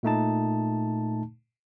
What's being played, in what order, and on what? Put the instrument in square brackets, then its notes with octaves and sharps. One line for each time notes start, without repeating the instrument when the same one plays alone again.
[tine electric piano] A#2 A3 D#4 A5